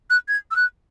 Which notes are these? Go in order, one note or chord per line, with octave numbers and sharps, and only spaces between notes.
F#6
G#6
E6
F#6